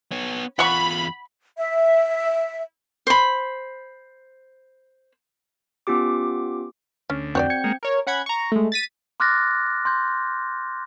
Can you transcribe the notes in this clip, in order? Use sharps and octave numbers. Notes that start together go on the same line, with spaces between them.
B3 C#5
E2 F4 F#5 B5 C#6
E5
C5 B5
B3 C#4 F4 G4 D6
D2 C#4
F2 C4 F#4 C#5 D5 G5 G6
G#6 C#7
G#3 A#3
A#4 C#5
C#4 F#5 B5 G#6
A#5 C#6
G#3 A3
A6 B6 D#7
C6 D6 F6 F#6 A6 A#6
C6 G6